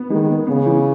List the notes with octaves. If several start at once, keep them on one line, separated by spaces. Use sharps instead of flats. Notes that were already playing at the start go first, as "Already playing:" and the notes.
Already playing: B3
D#3 G#3
B3
C#3 B3
E3